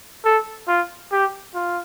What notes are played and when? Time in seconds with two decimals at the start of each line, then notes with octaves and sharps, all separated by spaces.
0.25 A4
0.68 F4
1.12 G4
1.55 F4